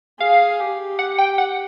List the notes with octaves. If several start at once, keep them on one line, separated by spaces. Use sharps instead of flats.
G#4 F5
G4
F#5
G5
F#5